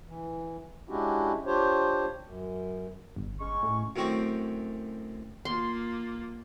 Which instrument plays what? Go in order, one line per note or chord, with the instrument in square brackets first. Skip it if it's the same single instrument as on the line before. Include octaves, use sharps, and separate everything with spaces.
[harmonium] E3
G#3 C#4 D4 E4 F#4 G4
D4 F4 G4 C5 C#5
F#2
[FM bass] G1
[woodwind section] G#3 C#4 C#6
[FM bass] A2
[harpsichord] F#2 A2 C4 C#6 D6
[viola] A#3 F4 [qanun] C6